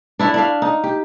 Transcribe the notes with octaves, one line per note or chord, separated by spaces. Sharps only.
D4 E4 C#5 E5
D4 E5 F5
D#4
G4